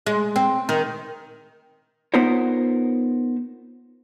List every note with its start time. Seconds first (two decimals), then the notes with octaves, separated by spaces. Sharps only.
0.06 G#3
0.36 C4
0.69 D#3
2.14 B3 D#4 F4 A#4 C5 C#5